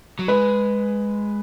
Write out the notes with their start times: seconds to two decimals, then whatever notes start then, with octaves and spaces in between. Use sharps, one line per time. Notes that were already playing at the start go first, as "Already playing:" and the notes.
0.19 F#3
0.28 G#3 B4